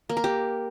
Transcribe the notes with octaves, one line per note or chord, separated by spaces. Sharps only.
A#3
A#4
G4